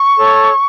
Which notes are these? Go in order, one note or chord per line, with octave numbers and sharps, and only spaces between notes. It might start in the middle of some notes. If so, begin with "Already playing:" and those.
Already playing: C#6
A4 C#5